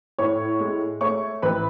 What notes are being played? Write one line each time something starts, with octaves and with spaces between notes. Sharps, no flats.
A2 C#5 C#6
G#3
A3 C#5 C#6
A1 B4 B5